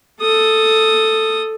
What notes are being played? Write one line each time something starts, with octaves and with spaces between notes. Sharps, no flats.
A4 D#6